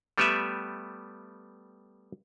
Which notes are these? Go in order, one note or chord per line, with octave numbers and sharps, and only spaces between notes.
G3 A3 B3 G4 B4 E5